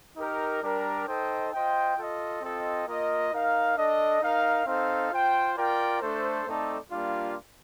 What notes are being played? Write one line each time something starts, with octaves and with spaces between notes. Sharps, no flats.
D#4 G4 A#4
G3 D4 G4 A#4
D#4 A4 C5 D#5 G5
F4 C5 D#5 G5
F4 A4 D#5
C4 F4 A4 D#5 G5
A#3 F4 A#4 D#5
D#4 A#4 F5
D4 A4 D#5
D#4 A#4 F5
C4 D#4 A4 C5 F5
F4 C5 G5
F4 A#4 D5 G5
A3 D4 A4 C5
A3 C4 D#4 A4 D5
G3 A#3 D4 F4